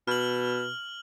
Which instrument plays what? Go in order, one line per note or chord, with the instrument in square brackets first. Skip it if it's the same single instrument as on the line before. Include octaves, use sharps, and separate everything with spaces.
[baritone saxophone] B2 [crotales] F6 F#7